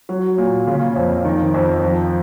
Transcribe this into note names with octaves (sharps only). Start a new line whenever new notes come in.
F#3
A#2
C#3
F2
D#3
F2
F3